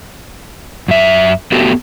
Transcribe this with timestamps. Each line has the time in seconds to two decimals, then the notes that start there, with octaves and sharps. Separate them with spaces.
0.88 F#2 E5
1.52 A3 B3 F#4 G4 A4